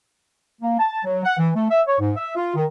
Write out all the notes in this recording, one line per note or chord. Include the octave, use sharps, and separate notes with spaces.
A#3
A5
F#3
F#5
E3
A3
E5
C#5
G#2
E5
F4
D#3